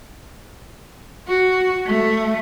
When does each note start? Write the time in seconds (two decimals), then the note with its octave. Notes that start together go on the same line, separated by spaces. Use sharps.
1.28 F#4
1.87 A3